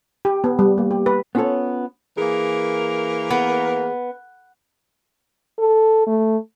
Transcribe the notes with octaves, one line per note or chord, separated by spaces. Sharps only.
G4
B3
G3
A#3
G4
B4
B3 C#4 F4 F#4 A4 C#5
E3 A#3 G#4 A#4
B3
A4
A3